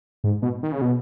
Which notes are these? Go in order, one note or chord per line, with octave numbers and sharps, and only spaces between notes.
G#2
B2
D#3
C#3
B2